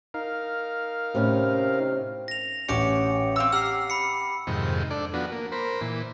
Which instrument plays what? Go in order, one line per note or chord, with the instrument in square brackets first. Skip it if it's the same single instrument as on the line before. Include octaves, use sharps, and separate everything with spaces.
[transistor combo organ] D#4 A#4 F5
[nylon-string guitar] A2 C#4 [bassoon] C3
[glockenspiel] A#6 F7
[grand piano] A1 C#4 [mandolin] F#4 G4 [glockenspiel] D6 C#7
[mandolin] C4 F5 E6
[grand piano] G4 [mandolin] F#5 A#5 F6 [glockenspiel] E6 C7
[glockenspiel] B5 C#7
[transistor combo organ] F2 G#2 C3 D#3
D4 A4 D5
F3 B3 D4 F#4
A#3
A#4 C5 B5
A#2 E3